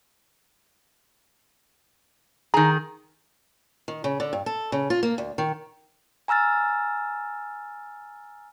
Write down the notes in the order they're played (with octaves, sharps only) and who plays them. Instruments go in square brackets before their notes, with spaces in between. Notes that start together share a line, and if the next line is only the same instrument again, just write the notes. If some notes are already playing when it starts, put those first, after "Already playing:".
[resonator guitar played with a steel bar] D#3 G#4 [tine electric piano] A#5
[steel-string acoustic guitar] D#3
C#3
D3
G2
A4
C#3
F4
A#3
D2
D#3
[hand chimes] G#5 A#5 E6 F6 A6